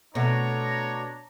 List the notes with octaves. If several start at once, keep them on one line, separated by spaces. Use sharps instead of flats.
B2 A3 D4 C#5 A#5